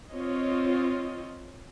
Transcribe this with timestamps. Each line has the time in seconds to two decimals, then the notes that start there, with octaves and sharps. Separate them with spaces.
0.11 C4 F4 C#5 D#5